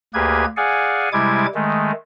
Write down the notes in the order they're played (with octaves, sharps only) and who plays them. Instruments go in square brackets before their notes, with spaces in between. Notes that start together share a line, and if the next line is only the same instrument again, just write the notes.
[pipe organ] D2 A#3 G4 G#4 B4 G#6
G#4 D5 F5 F#5 G#5
C3 G3 G#3 E4 D6 G#6
D#3 G#3 A3